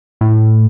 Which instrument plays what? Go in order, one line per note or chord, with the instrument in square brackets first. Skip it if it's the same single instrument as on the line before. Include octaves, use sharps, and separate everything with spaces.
[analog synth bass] A2